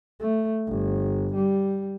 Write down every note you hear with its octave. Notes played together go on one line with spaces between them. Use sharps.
A3
G1
G3